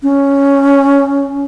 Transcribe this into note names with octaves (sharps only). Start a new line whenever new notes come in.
C#4